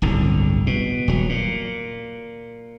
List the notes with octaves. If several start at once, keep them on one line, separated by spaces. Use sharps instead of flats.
D1 G1 C2 D3
B2
D#1 F#3
A#2